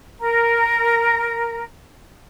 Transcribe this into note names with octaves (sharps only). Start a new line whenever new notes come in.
A#4 A#5